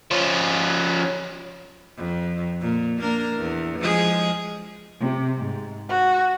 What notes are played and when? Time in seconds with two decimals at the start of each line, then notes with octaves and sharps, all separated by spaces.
0.11 F3 C#4
1.97 F2
2.62 A#2
2.98 A#3 D4 A#4
3.36 E2
3.80 F3 G#3 G#4
5.00 C3
5.36 G#2
5.89 F#4